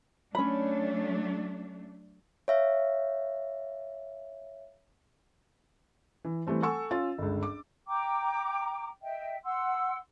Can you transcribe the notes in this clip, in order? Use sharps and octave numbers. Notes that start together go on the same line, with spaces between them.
F#3 A3 C#4 D4 B5
C#5 E5 F5
E3
E3 G3 A3 C4
A4 F#5 G#5 C#6 E6
C#4 F4 A6
G1 C#2
D6
G5 A#5 D6
D#5 E5 G5
F#5 C6 E6